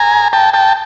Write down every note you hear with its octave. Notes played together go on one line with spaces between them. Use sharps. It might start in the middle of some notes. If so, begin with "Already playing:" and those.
Already playing: G#5 A#5
G5 A5
G5 A5